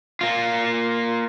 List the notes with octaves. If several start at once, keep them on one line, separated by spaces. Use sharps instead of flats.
A#3 F4